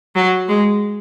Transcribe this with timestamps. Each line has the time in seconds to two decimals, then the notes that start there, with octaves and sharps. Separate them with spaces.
0.15 F#3
0.48 G#3